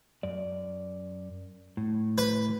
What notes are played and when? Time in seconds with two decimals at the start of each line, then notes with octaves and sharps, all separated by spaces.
0.23 F#2 D5
1.77 A2
2.18 B4